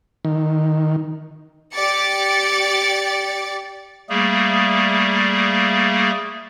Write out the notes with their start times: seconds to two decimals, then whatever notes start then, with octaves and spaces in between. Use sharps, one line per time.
0.25 D#3
1.73 G4 D5 D6 A6 C#7
4.09 G3 A3 A#3 G#4